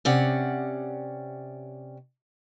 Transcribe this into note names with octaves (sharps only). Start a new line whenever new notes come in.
C3 C#4 D5 F#5